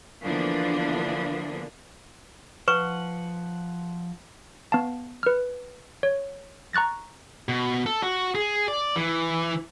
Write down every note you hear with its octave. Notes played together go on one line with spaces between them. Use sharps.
D3 E3 F3 A#3 B3 D4
F3 B4 F#5 C#6
B3 F5 A5
B4 F6
C#5
A#5 C#6 F#6 A6 A#6
B2
A4
F#4
G#4
D5
E3